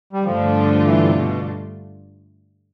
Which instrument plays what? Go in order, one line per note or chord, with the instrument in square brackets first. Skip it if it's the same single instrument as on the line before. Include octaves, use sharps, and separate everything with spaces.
[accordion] G3
[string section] G2 D3 A3 D4 F4 [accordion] F3
[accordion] E3
C3
B2